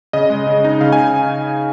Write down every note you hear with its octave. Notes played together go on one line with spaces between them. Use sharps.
C#3 D#5
G#3
C#3
D#4
C#3 F5
G#5